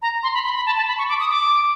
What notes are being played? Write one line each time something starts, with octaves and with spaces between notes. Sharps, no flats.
A#5
C6
B5
B5
B5
A5
A5
B5
C#6
D6
D#6
D6